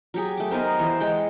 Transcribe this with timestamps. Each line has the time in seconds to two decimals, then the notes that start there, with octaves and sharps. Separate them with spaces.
0.14 F#3 G4 G#4
0.37 A3 D6
0.51 B3 D#4 A#4 C5
0.79 E3 C5
1.00 G#3 F#5 G5